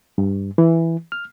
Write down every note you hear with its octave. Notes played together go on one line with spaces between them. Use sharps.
G2
E3
F6